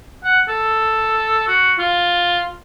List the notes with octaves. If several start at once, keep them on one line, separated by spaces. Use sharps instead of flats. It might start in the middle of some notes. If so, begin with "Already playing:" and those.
F#5
A4
F#4
F4